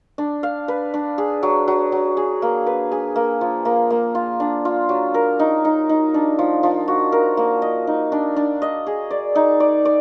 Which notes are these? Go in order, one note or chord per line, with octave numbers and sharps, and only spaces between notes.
D4
F5
B4
D4
G#4
F#3
F#3
F#3
G#4
A#3
B4
G#4
A#3
F3
A#3
A#3
F4
D4
F4
F#3
A#4
D#4
D#4
D#4
D4
F3
F3
F#4
A#4
A#3
D#5
D#4
D4
D4
D#5
G#4
D5
D#4
D5
D5